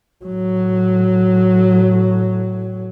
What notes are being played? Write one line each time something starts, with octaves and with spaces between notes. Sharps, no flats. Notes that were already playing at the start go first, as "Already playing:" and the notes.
A2 F#3